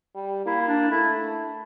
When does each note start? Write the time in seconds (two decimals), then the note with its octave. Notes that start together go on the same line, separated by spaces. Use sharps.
0.15 G3
0.46 A#3 E4
0.61 E4
0.68 D4
0.91 A3 E4